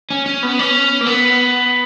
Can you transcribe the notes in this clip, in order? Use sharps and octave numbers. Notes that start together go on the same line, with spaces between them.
C#4
C#4
B3
C#4
A#3
B3